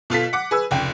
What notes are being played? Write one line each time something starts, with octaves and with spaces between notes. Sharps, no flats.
B2 F4 A4 B6
F#5 D6
G#4 B4 E6
F1 C#2 G5